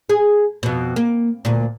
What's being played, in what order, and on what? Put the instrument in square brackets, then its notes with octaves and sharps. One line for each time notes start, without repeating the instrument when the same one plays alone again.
[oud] G#4
F2 B2
A#3
D2 A#2